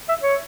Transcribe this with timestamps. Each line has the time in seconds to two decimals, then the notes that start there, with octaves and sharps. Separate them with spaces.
0.09 E5
0.22 C#5